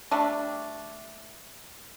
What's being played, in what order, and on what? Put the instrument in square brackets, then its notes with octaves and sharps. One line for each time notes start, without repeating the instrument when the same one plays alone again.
[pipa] G3 A3 D4